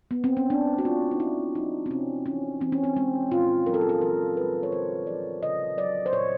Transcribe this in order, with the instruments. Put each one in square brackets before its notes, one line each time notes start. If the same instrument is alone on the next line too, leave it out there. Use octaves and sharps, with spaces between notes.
[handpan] B3
C4
C#4
A3 D4
F#4
A3 F4
D#4
B3 E4
F3 D#4
C4
C3 C#4
E3 C#4
E3 C4
C#4
C4
G#3 C4
A#2 F4
F#3 A#4
A4
G#4
A4
E3 A#4
G3 B4
C#5
D3 C5
F3 D5
C#3 D#5
F#3 D5
C5
A#2 C#5